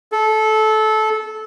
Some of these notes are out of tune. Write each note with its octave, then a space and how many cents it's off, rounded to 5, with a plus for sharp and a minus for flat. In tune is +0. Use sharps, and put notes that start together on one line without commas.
A4 -20